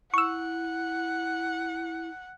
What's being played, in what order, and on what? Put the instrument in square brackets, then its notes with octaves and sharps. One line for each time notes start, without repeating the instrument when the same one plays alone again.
[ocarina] E4 [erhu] F#5 [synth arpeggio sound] C#6 E6